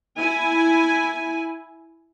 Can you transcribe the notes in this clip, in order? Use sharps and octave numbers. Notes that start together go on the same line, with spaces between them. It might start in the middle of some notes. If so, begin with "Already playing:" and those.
E4 G#5